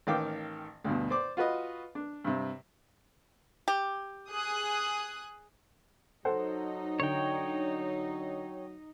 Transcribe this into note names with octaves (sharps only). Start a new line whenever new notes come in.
A1 D#3 F5 G5 D6
D2 G2 B2
C5 D5 D6
F4 F#4 B4 D#5
D4
G2 C3
G4
G#4 D#6 F#6
F#3 D#4 A4 C5 F#5
D3 C#5 G5